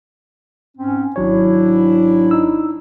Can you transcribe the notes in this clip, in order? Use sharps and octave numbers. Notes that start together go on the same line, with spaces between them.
G#2 C4 C#4
G#1 G#2 F#3 D4 E4 C#5
D#4 E6